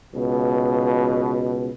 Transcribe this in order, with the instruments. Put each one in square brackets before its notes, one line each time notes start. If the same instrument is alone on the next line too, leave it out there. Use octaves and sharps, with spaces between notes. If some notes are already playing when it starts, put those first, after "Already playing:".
[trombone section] C#2 B2